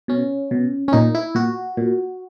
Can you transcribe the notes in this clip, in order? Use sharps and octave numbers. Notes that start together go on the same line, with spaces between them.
B2 C#4
B2
C#4
A#2 D#4
E4
A#2 F#4
A#2